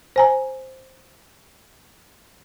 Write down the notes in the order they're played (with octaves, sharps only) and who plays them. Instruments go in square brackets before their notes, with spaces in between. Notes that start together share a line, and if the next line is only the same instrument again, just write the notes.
[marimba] C5 G#5 A#5